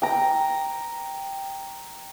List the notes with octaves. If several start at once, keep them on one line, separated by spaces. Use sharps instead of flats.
G5 A#5